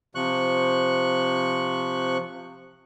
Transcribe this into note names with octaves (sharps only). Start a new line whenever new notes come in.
C3 F3 C#6 F#6